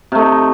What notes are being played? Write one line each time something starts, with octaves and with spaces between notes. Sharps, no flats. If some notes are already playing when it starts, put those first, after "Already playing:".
C3 A3 D#4